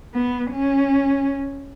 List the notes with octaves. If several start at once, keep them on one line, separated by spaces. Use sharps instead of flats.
B3
C#4